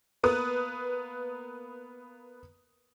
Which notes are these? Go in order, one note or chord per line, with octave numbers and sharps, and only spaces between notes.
A#3 B3 B4 D#6